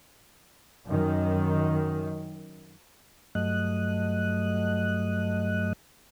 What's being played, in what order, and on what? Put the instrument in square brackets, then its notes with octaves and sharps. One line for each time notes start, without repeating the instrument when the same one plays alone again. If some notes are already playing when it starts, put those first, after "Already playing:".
[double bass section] F#2 D#3
[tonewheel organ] G2 F#3 A3 D#5 F#6